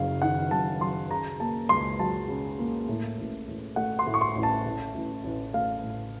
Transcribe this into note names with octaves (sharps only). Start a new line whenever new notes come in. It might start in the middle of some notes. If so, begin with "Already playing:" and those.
Already playing: F#1 F#2 F#3 F5
D#3 F#5
F#2 A5
F#3 C6
C#3 A#5
A#3 A5
C#2 C6
F#3 A5
C#3
A#3
A2
A1
A1
A3 F#5
C6
A2
C#6
C6
A1
A5
A2
A1
A1
A3 F5
A2